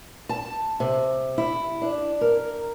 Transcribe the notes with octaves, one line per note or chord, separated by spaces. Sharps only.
A5
C3
E4
D4
A#4